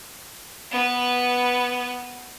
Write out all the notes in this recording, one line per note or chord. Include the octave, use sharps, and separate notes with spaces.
B3 B4